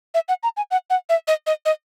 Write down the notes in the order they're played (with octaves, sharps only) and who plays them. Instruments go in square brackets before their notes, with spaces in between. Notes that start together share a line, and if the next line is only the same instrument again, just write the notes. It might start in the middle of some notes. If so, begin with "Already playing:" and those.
[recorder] E5
F#5
A#5
G#5
F#5
F#5
E5
D#5
D#5
D#5